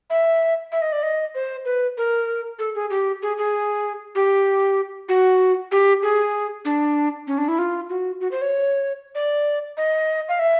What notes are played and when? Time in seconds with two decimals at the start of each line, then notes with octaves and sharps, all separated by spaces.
0.10 E5
0.72 E5
0.82 D#5
0.92 D5
1.03 D#5
1.35 C5
1.65 B4
1.97 A#4
2.59 A4
2.75 G#4
2.90 G4
3.22 G#4
3.38 G#4
4.15 G4
5.09 F#4
5.72 G4
6.03 G#4
6.65 D4
7.27 C#4
7.38 D4
7.48 E4
7.59 F4
7.90 F#4
8.21 F#4
8.32 C5
8.42 C#5
9.15 D5
9.77 D#5
10.29 F5
10.39 E5